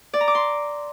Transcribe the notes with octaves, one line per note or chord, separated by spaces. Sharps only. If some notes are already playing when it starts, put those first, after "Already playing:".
D5
A#5
D6
C6